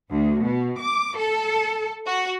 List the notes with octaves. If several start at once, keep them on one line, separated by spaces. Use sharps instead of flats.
D2
B2
D6
A4
F#4